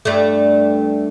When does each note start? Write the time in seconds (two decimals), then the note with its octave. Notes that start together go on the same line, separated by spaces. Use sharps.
0.05 G2 A3